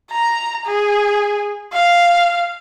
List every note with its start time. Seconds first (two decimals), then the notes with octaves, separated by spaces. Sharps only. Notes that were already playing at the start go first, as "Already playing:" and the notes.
0.11 A#5
0.66 G#4
1.73 F5